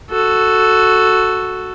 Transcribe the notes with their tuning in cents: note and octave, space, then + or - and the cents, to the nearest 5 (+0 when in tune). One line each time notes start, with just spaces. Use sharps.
F#4 +0 A4 +0